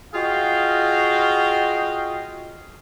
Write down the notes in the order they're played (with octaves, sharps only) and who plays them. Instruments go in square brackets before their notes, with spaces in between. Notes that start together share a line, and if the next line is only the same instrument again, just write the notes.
[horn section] F4 F#4 G#4 D#5 F5 G5